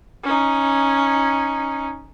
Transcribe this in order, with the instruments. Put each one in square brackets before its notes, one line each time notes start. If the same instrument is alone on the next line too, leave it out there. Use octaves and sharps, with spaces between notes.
[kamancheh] C#4 D#4